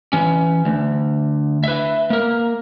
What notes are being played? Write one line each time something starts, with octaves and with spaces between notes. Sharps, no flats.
E3 C#4
D2
B4 E5
A#3 A#4